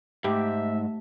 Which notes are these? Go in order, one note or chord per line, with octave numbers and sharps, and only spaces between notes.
G#2 A3 G4 E5